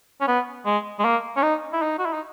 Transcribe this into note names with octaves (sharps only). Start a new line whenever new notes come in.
C#4
B3
G#3
G#3
A#3
C#4
D#4
E4
D#4
F#4
E4
D#4